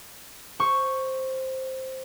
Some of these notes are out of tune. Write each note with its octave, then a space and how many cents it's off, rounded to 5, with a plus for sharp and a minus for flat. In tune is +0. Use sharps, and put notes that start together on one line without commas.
C5 +5 C#6 +0